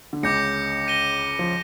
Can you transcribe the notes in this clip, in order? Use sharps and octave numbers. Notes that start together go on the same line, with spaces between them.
D3
C#2 C#3 D6 G6 A#6 C#7
G6 A#6 D#7 G7
F3